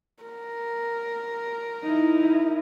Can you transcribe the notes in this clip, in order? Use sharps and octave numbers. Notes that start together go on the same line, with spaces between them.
A#4
D#4 E4